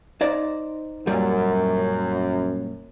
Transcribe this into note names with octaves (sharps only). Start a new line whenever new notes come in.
D#4 C5 D5
F#2 A#2 G3